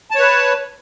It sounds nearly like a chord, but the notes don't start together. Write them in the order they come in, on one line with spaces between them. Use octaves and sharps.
A5 C#5 B4